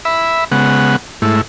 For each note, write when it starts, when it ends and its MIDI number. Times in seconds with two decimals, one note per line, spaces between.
0.05 0.44 76
0.05 0.44 83
0.52 0.96 49
0.52 0.96 56
0.52 0.96 59
0.52 0.96 78
1.22 1.41 44
1.22 1.41 57
1.22 1.41 64